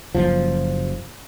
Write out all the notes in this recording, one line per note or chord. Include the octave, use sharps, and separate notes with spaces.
F#1 F3